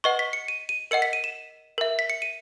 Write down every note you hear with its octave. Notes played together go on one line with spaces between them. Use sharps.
B4 D#5 F#5 C#6
B6
C#7
D#7
D#7
A#4 D#5 F#5 C#7
B6
D#7
E7
A#4 E5
B6
C#7
D#7